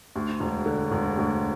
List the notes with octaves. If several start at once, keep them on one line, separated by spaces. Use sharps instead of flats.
D2
E1
D3
E1
D2